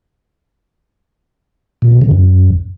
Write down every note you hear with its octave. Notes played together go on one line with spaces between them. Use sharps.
A#2
B2
C#3
F#2